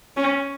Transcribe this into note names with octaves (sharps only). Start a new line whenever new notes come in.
C#4